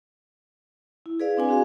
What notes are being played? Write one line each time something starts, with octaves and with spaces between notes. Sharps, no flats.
E4
G#4 B4 D5 F5
C4 D4 G#5
C4 F#4 G#4 F5